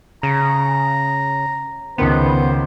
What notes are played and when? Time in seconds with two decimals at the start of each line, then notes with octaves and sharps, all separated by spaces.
0.23 C#3 A#5
1.98 C#2 D#3 B3 C5